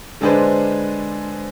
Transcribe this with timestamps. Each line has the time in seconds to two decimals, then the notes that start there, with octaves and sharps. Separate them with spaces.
0.21 D3 G#3 D4 G#4 B4 C5